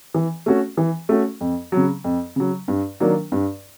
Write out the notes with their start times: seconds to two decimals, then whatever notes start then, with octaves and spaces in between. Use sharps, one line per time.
0.14 E3
0.46 A3 C#4 F#4
0.77 E3
1.09 A3 C#4 F#4
1.41 F2
1.72 C#3 F#3
2.04 F2
2.36 C#3 F#3
2.68 G2
3.00 D#3 F#3 A#3 D4
3.32 G2